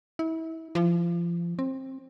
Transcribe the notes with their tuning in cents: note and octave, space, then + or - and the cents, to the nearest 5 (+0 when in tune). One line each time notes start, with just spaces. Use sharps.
E4 -30
F3 -30
C4 +20